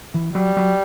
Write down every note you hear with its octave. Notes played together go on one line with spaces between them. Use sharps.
E3
F#3 G3
F#3